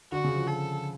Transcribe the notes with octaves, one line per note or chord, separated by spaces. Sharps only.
D3 F#4
C#3
F3
A4